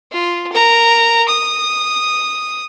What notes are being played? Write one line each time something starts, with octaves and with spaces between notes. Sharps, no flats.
F4
A#4 A#5
D#6